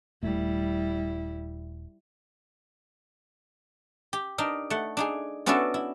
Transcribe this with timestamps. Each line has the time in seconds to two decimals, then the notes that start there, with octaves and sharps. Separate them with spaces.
0.23 D#1 G3 A3 E4
4.13 G4
4.38 D4 D#4 A#4
4.70 A3 F#5
4.97 D4 D#4 G#4
5.46 B3 C#4 D4 E4 F#4 A4
5.74 E4